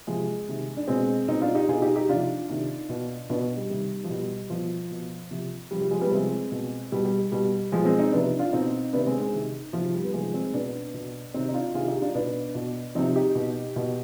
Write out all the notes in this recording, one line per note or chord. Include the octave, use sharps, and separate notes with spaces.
C3 F3 G#3
C3 D#3
D4
B2 G#3 C4
B2 C4 D#4
D4 F4
D#4 G4
B2 F4 G#4
D#4 G4
D#4 G4
C3 F3 D4 F4
C3 D#3
B2
B2 B3 D4
G3
C3 D#3 G3
F3
B2 G3
B2 F3
B2
C3 F3
C3 F3 G3
G3
F3 G#3
G3 B3
C3 F3 G#3 C4
B2
B2 G3
G3
B2 G3
B2 F3 G#3
G#3 C4
C4 D#4
C3 F3 B3 D4
D4 F4
B2 C4 D#4
C3 D#3 B3 D4
G#3 C4
G#3 C4
C3 D#3
C3 D#3 F3
G3
B3
C3 D#3 F3 G#3
G#3 C4
B2 B3 D4
B2
C3 D#3 C4 D#4
D#4
D4 F4
C3 D#3 F4 G#4
D#4 G4
D4 F4
B2 B3 D4
B2
C3 F3 C4 D#4
D#4 G4
B2
B2